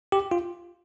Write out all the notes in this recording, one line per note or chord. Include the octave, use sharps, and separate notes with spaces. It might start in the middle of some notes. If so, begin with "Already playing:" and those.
G4
F4